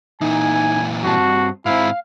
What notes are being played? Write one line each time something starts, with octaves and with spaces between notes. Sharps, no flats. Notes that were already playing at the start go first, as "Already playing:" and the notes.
A#2 E3 D#4 G#5
G2 C4 F#4 A5
G#2 C4 E4 F5